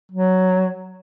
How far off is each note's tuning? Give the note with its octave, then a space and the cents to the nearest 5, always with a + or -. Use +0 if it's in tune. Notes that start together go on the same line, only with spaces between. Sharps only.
F#3 +5